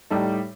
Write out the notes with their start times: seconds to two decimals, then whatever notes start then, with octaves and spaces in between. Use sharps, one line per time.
0.10 A2 G3 D#4 A4